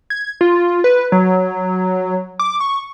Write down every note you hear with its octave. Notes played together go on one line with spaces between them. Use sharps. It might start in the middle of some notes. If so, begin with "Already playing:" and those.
G#6
F4
B4
F#3
D6
C#6